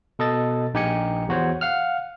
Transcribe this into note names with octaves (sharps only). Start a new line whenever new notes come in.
B2 A4 D#5 A6
A#1 D#4 G4 G#5 C#7
E2 F#4 C5 C#5
F5 F#5 F6